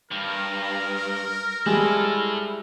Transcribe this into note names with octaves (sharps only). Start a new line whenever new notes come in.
G2 A#4
G3 G#3 E4 A4